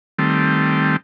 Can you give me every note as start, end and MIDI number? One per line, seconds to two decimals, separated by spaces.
0.19 0.96 51
0.19 0.96 55
0.19 0.96 57
0.19 0.96 60